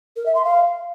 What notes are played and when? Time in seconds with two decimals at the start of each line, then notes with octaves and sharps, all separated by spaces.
0.16 A#4
0.26 E5
0.35 C6
0.45 F5